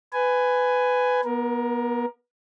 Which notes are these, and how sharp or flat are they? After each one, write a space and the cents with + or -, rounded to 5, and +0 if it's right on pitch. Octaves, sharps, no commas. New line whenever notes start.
B4 +15 G#5 +0
B3 -30 A#4 +15